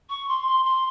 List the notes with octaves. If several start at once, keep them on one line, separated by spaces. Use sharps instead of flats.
C#6
C6
C6
C6